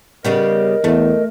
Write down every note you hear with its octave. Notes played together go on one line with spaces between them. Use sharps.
C#3 G3 B3 A#4 D#5
E2 A3